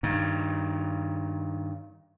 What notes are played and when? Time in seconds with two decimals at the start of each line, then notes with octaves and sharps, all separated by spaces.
0.03 G2 D#3